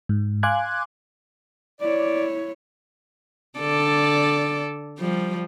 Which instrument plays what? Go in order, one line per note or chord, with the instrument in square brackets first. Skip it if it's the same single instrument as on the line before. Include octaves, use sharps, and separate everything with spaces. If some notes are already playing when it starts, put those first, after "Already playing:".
[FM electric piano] G#2
F5 G#5 C6 D6 F#6 G#6
[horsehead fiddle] E4 C#5 [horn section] D5
[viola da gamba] D3 A4 D5
F3 G3